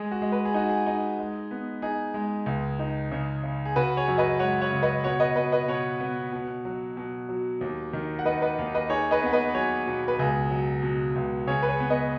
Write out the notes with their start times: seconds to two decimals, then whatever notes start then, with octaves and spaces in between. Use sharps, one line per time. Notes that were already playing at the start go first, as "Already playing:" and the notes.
Already playing: G#3 G#4
0.12 F#4
0.22 G#3
0.32 B4
0.45 G#4
0.54 D#4 F#4
0.69 G#4
0.86 D#4
1.19 G#3
1.51 B3
1.82 D#4 G#4
2.14 G#3
2.46 C#2
2.79 D#4
3.12 C#3
3.43 C#3
3.65 G#4
3.76 C#3 F#4 B4
3.97 G#4 C#5
4.08 F#2
4.18 B4 D#5
4.39 G#3 C#5 F#5
4.61 C#5 F#5
4.72 C#3
4.82 B4 D#5
5.04 B2 C#5 F#5
5.20 B4 D#5
5.36 B2 B4 D#5
5.52 B4 D#5
5.68 B2 C#5 F#5
6.00 B3
6.32 B2
6.65 F#3
6.97 B2
7.29 F#3
7.61 D#2
7.93 D#3
8.19 F#5
8.26 D#3 B4 D#5
8.42 B4 D#5
8.58 D#2
8.75 B4 D#5
8.90 D#4 G#4 C#5
9.11 B4 D#5
9.22 B3 F#5
9.33 B4 D#5
9.54 F#3 G#4 C#5
9.87 B2
10.08 B4
10.19 C#2 G#4
10.50 F#3
10.82 B2
11.16 C#2
11.47 C#3 G#4 C#5
11.63 B4
11.68 G#4 C#5
11.80 B3
11.90 B4 D#5